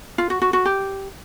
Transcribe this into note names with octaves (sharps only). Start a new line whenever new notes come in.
F4
F#4
F#4
F#4
G4